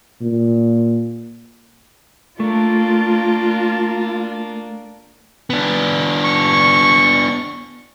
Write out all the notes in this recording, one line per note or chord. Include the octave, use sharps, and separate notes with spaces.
A#2
A3 A#3 D4 F4
B3 D4
C#6